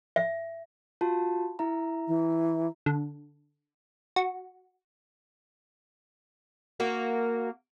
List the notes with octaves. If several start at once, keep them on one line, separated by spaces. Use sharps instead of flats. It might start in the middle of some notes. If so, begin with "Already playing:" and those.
E5
F4 F#4 A5
E4 E5 A#5
E3
D3
F#4
A#3 F#4 A#4